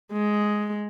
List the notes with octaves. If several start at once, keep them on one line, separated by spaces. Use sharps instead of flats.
G#3